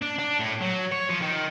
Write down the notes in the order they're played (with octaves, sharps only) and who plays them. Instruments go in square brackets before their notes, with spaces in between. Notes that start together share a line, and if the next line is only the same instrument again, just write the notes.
[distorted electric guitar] D4
D4
A2
F#3
C#5
F3
D#3